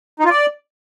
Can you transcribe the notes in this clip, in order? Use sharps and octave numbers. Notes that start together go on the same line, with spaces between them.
D#4
F4
D5